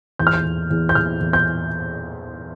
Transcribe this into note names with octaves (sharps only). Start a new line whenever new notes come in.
E2 G6
F6
G6
E2
E2
G6
E2 F6
E2
G6